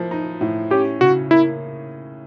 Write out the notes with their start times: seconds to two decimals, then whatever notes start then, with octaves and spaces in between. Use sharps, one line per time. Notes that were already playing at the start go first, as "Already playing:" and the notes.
Already playing: A2 F3 A#3
0.11 D#4
0.41 A2
0.71 C#4 G4
1.01 C#3 F#4
1.31 A#3 E4